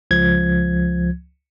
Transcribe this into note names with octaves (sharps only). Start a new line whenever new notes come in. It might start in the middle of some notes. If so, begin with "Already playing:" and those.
C#2 F3 G#6